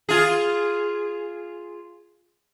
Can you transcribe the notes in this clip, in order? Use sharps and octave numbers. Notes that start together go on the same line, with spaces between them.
F4 G#4